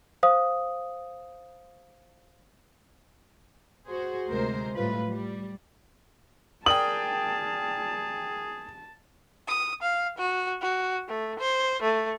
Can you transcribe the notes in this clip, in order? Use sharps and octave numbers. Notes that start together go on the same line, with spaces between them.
C5 F5 D#6
F#4 G#4 C5
D2 C3 G#3 A#4 C5
A2 G3 F4 B4
G3
G#4 A#4 D5 G5 A5 D#6 F#7
D#6
F5
F#4
F#4
A3
C5
A3